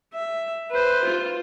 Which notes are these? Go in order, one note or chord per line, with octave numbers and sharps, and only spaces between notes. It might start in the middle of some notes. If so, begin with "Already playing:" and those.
E5
B4 C5
F4